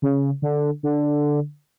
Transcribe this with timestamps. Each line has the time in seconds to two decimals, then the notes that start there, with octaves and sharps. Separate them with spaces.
0.02 C#3
0.42 D3
0.83 D3